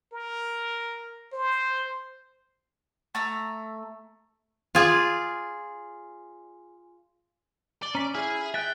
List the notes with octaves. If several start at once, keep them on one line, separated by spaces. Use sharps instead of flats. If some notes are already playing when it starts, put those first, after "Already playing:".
A#4
C5
A3 A#5 E6
F4 G#4 D5
D5 G7
C#4 A#5 B6
E4 G#4 F6
E5 G5 F#6 A6